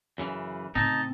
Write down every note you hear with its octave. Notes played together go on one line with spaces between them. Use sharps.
F#2 C#3 E3
A2 C#3 C4 D#4 A5